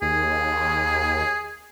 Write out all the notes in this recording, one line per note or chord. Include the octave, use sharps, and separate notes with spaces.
D#2 G#4